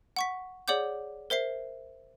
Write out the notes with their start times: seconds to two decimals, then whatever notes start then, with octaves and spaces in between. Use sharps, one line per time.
0.16 F#5 C#6 B6
0.68 G#4 C#5 D5 F#5 D6 G6
1.30 A#4 C5 E5 C7